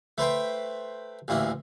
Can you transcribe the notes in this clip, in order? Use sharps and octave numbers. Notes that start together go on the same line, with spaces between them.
A3 B4 C5 G5
A1 D2 A#3 E4